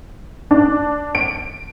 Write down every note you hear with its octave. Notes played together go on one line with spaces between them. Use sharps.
D4
D7